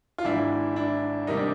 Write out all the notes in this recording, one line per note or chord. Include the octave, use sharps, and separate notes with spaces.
F4
G#1 G#2 E3 D4 E4
D4 E4
C3 D#3 G3 A#3 D#4
D4